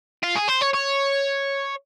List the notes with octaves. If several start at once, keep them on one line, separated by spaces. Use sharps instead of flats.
F4
G#4
C5
C#5
C#5